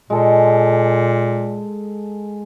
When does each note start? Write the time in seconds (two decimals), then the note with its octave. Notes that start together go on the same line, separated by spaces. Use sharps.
0.10 A#2 G#3 A4